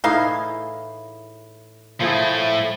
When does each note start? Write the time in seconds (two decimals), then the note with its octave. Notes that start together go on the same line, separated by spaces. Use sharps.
0.04 A2 E3 D#4 G#4 F5
2.01 A2 F3 A3 E4 G#4